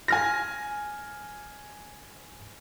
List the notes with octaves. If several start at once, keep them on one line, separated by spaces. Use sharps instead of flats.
G#5 F6 A#6